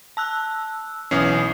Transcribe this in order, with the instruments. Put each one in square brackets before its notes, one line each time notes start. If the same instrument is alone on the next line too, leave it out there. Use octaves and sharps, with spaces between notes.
[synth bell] A5 E6 F#6
[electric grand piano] B1 E3 C#4 [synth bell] D#6 C7